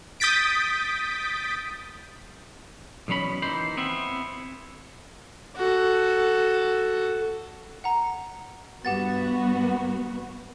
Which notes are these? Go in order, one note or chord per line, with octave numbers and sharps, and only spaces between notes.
D#6 G6 A6 B6 D7
B1 E2 B2 C#4 B5
D#2 E3 D#4 C5 B5
B3 C4 E4
F#4 A4
F#5 A#5
G2 B3 F#4 G4 F#5 A6